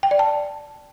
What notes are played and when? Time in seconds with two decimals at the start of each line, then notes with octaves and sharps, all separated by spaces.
0.03 G5
0.11 D5
0.19 A5